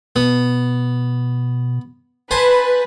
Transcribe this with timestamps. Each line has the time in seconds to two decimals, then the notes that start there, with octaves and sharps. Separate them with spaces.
0.16 B2 B3
2.31 B4 C5 G#5 A5